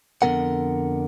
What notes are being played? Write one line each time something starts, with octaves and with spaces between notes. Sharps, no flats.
F2 D3 E3 B3 A#4 F#5